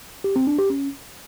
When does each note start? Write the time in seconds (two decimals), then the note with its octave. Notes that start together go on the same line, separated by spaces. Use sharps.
0.24 G4
0.36 C4
0.47 D4
0.59 G4
0.70 C#4